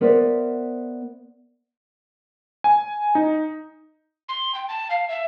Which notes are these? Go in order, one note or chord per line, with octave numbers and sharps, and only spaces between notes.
B3 A#4 C5 D5 E5
G#5
D#4
C6
G5
A5
F5
E5